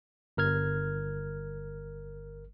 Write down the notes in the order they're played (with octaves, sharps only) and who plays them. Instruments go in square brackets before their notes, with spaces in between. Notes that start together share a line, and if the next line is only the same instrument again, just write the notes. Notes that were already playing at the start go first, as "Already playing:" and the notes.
[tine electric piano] G1 A#4 F6 G#6